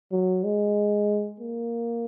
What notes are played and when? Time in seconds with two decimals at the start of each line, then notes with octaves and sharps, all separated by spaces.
0.12 F#3
0.44 G#3
1.40 A#3